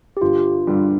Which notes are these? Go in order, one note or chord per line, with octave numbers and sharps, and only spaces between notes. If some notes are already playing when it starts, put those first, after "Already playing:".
G4
G1 F4
G2 D3 G3